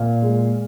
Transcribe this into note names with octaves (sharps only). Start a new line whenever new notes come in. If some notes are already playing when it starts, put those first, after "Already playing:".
Already playing: A#2 F5
G#3